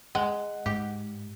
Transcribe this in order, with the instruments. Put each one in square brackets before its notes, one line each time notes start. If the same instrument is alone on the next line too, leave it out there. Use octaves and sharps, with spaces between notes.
[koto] G#3 [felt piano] F#5
[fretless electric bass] G#2 [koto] G4